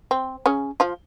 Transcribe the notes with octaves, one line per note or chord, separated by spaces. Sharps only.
C4
C#3 C#4
F3 F4